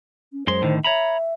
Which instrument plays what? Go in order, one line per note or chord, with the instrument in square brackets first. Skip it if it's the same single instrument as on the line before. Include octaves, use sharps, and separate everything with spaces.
[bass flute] C#4
[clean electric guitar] F#2 G#3 C6 [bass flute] C5
[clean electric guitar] A2 D3 D#3
[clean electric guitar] C#5 A#5 B5 [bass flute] E5